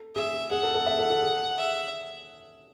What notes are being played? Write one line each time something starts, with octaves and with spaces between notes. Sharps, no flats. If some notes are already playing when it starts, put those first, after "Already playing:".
Already playing: A4
G#4 E5
G#4 F#5
A4
A4
E5
A4
A4
G#4
E5